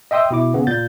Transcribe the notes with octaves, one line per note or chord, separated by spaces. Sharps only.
D#5 E5 G5 C6 D#6 E6
B2 E4 D6
C#3 B3
A#2 G6 A6